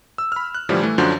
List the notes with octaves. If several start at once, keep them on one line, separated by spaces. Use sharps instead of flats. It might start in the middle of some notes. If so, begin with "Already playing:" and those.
E6
B5 F6
F#6
A2 D3 E3 F3 G3
E3 A3
F#2 D3 F3 D4 F#4 G6